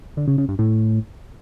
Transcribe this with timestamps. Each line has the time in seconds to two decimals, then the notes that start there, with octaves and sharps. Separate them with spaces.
0.17 D3
0.28 C#3
0.38 C#3
0.48 G2
0.59 A2